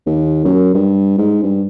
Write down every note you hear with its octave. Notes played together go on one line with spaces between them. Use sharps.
D#2
F#2
G2
G#2
G2